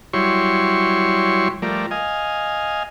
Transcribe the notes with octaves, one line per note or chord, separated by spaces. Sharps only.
F#3 G3 E4 C#5 C6 C#6
F3 G3 A3 A#4 D5
D#5 F5 G#5